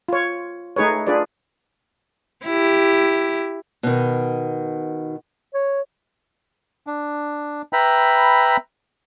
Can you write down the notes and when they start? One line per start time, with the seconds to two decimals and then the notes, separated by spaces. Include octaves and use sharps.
0.09 F4 C#5
0.76 A3 D#4 G#4 B4 C#5
1.06 D4 F4 G#4 B4 D5
2.46 E4 G4
3.83 B2 D#3
5.54 C#5
6.87 D4
7.73 B4 E5 G5 A#5 B5